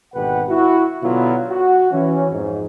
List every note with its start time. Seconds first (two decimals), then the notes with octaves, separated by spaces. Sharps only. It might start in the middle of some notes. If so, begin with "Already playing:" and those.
0.14 G#1 B2 D3 G4 B4 F#5
0.49 E4 F#4
1.02 B2 D3 F#3 B3 E4 F4
1.49 F#4
1.91 E3 C#4
2.30 F2 G#2